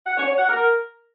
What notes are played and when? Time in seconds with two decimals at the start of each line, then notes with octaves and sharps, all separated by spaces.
0.06 F#5
0.17 C#5
0.27 C#5
0.38 F#5
0.49 A#4